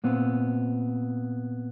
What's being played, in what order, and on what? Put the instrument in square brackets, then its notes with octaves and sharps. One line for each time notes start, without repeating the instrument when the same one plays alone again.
[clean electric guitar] A#2 B3 C4